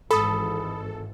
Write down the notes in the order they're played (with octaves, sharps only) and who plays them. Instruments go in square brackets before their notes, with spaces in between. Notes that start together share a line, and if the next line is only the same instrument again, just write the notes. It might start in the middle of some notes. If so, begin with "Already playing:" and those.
[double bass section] G#1 G#2 E3 [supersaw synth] A4 [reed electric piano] B5 D#6